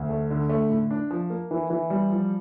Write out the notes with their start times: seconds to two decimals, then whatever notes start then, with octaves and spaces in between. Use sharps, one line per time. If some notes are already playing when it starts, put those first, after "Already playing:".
Already playing: D2
0.09 A3
0.30 D3
0.49 A3
0.70 A2
0.91 D4
1.11 F3
1.30 A#3
1.51 E3
1.70 E3
1.90 G3
2.10 F3